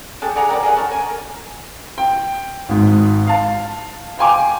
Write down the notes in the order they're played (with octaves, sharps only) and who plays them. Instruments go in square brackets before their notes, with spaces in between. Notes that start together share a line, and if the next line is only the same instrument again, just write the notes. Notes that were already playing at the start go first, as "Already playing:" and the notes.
[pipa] G#3 G4 A4
D4 G#4 F#5 A#5
G4 A#4 B4 D5
G#4 A#4 D#5 F#5
A#4 C#5 A5
A#4 G#5
[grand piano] G5
G#1 G#2
F5 A5
F5 G5 G#5 D6